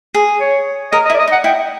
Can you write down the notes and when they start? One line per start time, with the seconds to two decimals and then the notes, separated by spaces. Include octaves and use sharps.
0.14 G#4
0.41 C#5
0.92 A#4 D#5
1.06 D#5
1.10 E4
1.14 D5
1.19 D#5
1.28 D#4
1.32 F#5
1.44 E4 G5